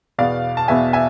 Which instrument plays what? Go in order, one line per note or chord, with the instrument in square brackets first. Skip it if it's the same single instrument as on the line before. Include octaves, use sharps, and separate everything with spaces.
[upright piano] E2 B2 B3 D5 F5
A5
E2 B2 B3 E5 G#5
E5 G#5